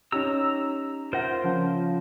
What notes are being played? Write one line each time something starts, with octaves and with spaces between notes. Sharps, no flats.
C#4 D#4 G4 A#5 E6
F4 A#4 C5 E5 F#5 A#6
C#3 F3